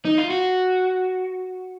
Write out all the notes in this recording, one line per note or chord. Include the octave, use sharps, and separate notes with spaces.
D#4
F4
F#4